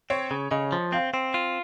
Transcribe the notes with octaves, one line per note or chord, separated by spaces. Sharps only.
C4 C#5
C#3
C#3 D#5
F3
C4 F5
C4
F4